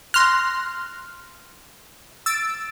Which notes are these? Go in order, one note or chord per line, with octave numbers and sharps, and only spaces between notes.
C6 F6 F#6 A#6
E6 A6 D7